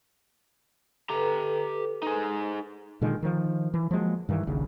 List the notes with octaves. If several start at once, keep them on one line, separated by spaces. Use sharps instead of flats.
G4 A4 B4 A#5
D#4 G#4
A#2 D3 D#3 G#3
D#3 F3
E3
F3 F#3 G#3 A#3
G2 D#3 E3
D#1 A#1 D#2 C#3